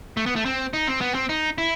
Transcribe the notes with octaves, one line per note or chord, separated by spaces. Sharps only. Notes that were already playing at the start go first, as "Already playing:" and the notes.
A3
B3
A3
C4
D#4
C4
B3
C4
D#4
E4